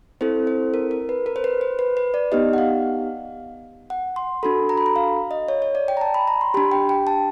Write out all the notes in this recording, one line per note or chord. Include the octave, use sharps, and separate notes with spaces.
C4 E4 A4 C5
C5
A#4
A#4
B4
A#4
C5
B4
C5
B4
B4
D5
B3 D#4 G4 D#5
F#5
F5
F#5
C6
D4 F#4 A4 B5
A#5
B5
A#5
F5
D#5
C#5
C#5
D5
G5
A#5
A5
B5
A#5
C6
D4 G4 B5
G5
G5
A5